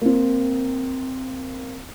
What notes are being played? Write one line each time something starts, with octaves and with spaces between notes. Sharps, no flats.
A#3 C4